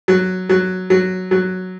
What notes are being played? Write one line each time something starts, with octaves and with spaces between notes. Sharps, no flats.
F#3
F#3
F#3
F#3